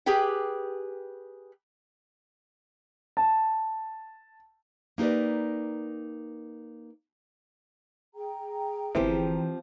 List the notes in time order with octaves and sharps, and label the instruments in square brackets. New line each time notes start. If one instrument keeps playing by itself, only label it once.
[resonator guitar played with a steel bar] G4 G#4 B4 G5
[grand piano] A5
[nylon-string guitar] A#3 D#4 G4 B4 D5
[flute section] G#4 G5 A#5
[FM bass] G1 [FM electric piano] E3 [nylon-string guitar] F3 C4 G4